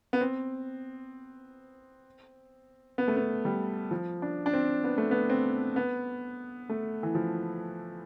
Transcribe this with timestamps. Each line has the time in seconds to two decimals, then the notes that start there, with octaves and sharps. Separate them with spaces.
0.13 B3
0.21 C4
2.98 B3
3.08 A3
3.16 B3
3.45 G3
3.91 F3
4.22 D4
4.46 D4
4.53 C4
4.84 B3
4.98 A3
5.11 B3
5.30 C4
5.76 B3
6.69 A3
7.03 E3
7.15 F3